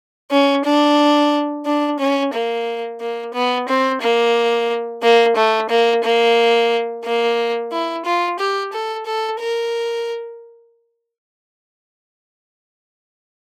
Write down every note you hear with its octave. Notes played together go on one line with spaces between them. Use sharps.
C#4
D4
D4
C#4
A#3
A#3
B3
C4
A#3
A#3
A3
A#3
A#3
A#3
E4
F4
G4
A4
A4
A#4